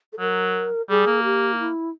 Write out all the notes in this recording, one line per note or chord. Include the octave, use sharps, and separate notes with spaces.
A4
F#3 A#4
G3 G#4
A#3
G4
F4
E4